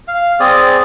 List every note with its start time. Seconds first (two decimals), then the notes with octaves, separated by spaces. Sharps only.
0.08 F5
0.40 C4 G#4 D5